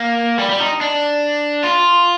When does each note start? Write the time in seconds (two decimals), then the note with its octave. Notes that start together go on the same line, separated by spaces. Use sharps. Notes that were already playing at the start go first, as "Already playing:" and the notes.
Already playing: A#3
0.39 G3
0.50 G3
0.60 D#4
0.81 D4
1.64 F4